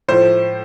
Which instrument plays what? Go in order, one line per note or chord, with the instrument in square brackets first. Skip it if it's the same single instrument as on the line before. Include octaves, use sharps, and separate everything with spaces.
[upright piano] A2 F3 C5